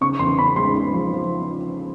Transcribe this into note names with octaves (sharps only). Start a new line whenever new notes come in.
C#3 C#6
E2 C6
C#3 B5
G#3 C6
G#3
F3
F3